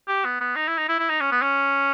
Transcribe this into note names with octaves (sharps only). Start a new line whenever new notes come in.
G4
B3
B3
D#4
E4
D#4
E4
E4
D#4
C#4
B3
C#4